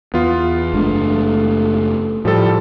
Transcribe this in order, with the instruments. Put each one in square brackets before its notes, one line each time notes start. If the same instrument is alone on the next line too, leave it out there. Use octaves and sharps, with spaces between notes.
[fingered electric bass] E2 [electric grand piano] B3 F4
[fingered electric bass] F#1 G#3 D4 [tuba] A3
[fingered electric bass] A2 [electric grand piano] F3 G3 A4